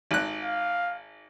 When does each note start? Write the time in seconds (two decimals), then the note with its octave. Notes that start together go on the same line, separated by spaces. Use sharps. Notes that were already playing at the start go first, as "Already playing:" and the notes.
0.11 G#1 F#6
0.43 F5